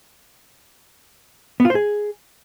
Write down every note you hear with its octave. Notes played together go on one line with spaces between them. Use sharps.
B3
F4
C5
G#4